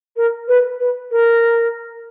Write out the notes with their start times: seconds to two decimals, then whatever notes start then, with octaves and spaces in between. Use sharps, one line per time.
0.16 A#4
0.48 B4
0.79 B4
1.11 A#4